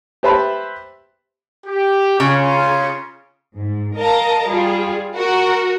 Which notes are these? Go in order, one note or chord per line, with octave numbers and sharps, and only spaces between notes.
G4 B4 C5 E5 A5 B5
G4
C#3 C#4 F4
G#2
A#4 D#5 F5 A5 A#5
G3 F4 G#4
F#4 A#4